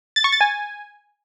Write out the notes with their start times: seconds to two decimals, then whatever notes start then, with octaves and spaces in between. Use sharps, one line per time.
0.16 A6
0.24 C#6
0.32 A6
0.41 G#5